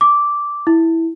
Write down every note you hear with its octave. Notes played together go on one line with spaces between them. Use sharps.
D6
E4